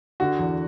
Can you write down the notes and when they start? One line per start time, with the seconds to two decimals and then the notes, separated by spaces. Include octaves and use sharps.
0.20 D3 F#4
0.39 E2